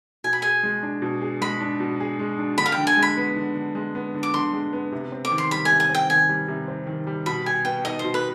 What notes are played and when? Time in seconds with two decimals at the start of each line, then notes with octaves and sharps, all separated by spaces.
0.24 B2 G#5
0.33 B5
0.42 G#4 G#5
0.63 G#3
0.83 D4
1.02 B2
1.21 G#4
1.41 G#3 B5
1.61 D4
1.80 B2
2.00 G#4
2.19 G#3
2.39 D4
2.58 D3 B5
2.66 F5
2.72 G5
2.78 D3
2.87 G#5
2.97 G#3
3.03 B5
3.17 B3
3.36 D3
3.55 D3
3.75 G#3
3.95 B3
4.14 D3
4.23 D6
4.34 D3 C6
4.53 G#3
4.73 B3
4.92 C3
5.12 C4
5.25 D6
5.31 D#3
5.38 C6
5.51 G3 B5
5.65 C3 G#5
5.80 G#5
5.90 C4 G5
6.10 D#3 G#5
6.29 G3
6.48 C3
6.68 C4
6.87 D#3
7.07 G3
7.26 B2 B5
7.46 G4 G#5
7.65 B3 G5
7.85 D#4 D#5
7.99 C5
8.04 B2
8.14 B4